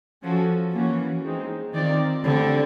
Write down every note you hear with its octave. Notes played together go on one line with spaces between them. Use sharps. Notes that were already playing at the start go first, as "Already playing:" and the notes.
F3 C#4 F#4 A4
E3 A#3 C#4 F#4
G#3 C4 D#4
D#3 C4 F4 A#4 D5
D3 A3 C4 E4 G4